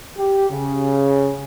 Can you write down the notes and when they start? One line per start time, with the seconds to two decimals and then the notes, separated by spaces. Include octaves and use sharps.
0.17 G4
0.51 C#3